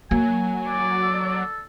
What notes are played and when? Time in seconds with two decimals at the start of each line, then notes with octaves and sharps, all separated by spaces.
0.11 F#3 A#3 G#5
0.69 D5
1.02 A4